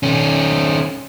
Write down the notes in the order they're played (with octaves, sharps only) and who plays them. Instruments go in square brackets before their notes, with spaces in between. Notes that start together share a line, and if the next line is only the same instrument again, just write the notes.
[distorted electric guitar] D#3 C#4